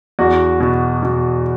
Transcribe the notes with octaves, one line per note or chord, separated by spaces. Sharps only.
E2 F#4
B2
B2